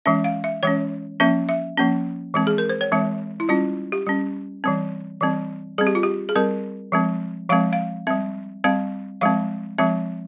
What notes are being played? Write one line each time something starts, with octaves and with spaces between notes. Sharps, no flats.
E3 G#3 C#4 E5
F5
E5
E3 G#3 C#4 C#5
F3 A#3 C#4 E5
E5
F3 A#3 C#4
E3 G#3 C4
G#4
A#4
C5
C#5
E3 G#3 C4 E5
E4
G3 C#4 F4
G4
G3 C#4
E3 G3 C4
E3 G3 C4
G3 C4 G#4
G4
F4
G4
G#4
G3 C4 A#4
F3 G#3 C4
F3 G#3 C4 F5
F5
G3 C4 E5
G3 C4 F5
F3 G#3 C4 F5
F3 G#3 C4 E5